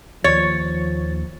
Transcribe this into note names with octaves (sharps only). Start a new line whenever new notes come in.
D#2 F3 C#5 A6